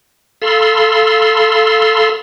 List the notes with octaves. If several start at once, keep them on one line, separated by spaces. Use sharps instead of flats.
A4 F5 B5 C6 E6